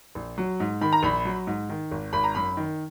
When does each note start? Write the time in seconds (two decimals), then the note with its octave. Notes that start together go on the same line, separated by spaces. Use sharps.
0.15 A#1
0.38 F#3
0.60 G#2
0.81 D#3 B5
0.93 A#5
1.03 A#1 B5
1.25 F#3
1.47 G#2
1.69 D#3
1.91 G#1
2.13 G#1 B5
2.24 A#5
2.35 F#2 B5
2.57 D#3